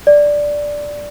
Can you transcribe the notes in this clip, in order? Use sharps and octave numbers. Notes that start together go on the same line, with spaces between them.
D5